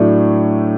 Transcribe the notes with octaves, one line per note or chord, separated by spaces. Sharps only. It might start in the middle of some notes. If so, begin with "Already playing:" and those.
Already playing: A2 F#3 A3 D4